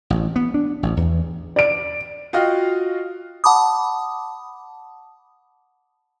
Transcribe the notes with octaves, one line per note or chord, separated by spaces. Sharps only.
A1
B3
D4
A1
E2
D5 D7
F4 F#4 D#5 F5 G5 F6
F#5 A5 B5 D6 D#6